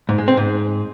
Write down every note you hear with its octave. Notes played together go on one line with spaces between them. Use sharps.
G#2
G#3
C4
G#2